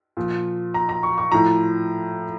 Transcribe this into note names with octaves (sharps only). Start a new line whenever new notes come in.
A#2 F3
A#5
A#5
C#6
C#6
A2 F3 A#5